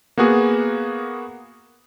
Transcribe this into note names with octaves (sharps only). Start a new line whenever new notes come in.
A#3 B3 F#4 G#4